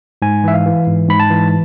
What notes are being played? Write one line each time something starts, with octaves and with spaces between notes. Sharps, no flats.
G#2 G#5
E3 E5
F5
E3
G#2
G#2 B5
A5
E3